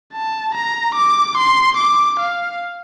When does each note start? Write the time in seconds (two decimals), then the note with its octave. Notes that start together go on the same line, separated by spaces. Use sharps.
0.13 A5
0.55 A#5
0.95 D6
1.37 C6
1.77 D6
2.19 F5